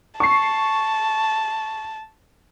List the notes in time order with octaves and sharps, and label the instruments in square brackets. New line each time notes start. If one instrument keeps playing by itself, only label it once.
[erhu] A5 [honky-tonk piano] C#6 C7